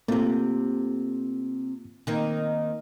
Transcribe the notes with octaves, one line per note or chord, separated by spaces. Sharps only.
C3 A3 A#3 C4 F4
D#3 A#3 C4